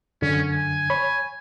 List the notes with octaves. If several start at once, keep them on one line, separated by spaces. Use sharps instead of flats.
F#2 D3 C#4
G#5
C#5 B5